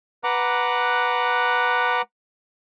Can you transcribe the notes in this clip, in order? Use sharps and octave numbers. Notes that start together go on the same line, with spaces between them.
B4 F#5 A#5 D6 F#6